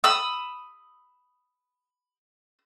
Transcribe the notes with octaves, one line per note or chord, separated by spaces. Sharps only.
B5 D#6 E6